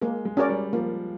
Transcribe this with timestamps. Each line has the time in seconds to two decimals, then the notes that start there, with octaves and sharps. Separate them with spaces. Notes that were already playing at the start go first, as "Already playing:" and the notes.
0.01 G#3 A#3
0.25 G#3
0.37 C#4 F#4 A#4 D5
0.49 G3
0.73 F3 A#3